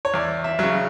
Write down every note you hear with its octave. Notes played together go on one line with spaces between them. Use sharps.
C#5
E2 D5
E5
C#3 F#3